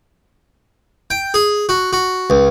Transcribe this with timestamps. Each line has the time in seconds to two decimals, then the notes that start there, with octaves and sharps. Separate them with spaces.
1.10 G5
1.34 G#4
1.69 F#4
1.93 F#4
2.30 C#2